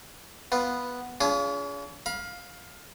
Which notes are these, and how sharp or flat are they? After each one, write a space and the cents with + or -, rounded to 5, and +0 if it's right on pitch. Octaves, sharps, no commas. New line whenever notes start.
B3 +0 F4 +0
C#4 +45 F4 -20 G#4 +0
F5 +15 B5 -35